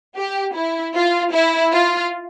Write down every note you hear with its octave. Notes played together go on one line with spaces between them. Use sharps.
G4
E4
F4
E4
F4